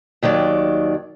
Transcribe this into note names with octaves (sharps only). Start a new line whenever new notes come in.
D#2 D#3 F#3 D5